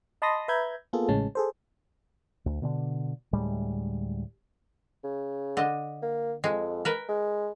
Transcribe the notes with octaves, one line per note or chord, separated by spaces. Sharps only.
D#5 A5 B5 C6 D#6 A#6
B4 E5 A#5 B5 G6 G#6
A#3 B3 F4 G#4 A4
A1 A2 C#3 G#3 C#4 A5
G#4 A4 C5
D2
B2 D3 C4 D4
D2 A2 G3 G#3
C#3
D3 D#5
A#3
F2 G#3
A#4 B4
G#3